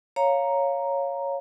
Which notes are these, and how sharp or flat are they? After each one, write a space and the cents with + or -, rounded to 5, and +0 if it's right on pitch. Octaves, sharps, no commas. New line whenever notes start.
C#5 +0 F5 +0 A#5 +0